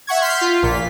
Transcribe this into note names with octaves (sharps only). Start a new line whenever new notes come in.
E5 F#5 C#6 G#6
C6 F6 G6 B6
F4
A#1 A#2 B6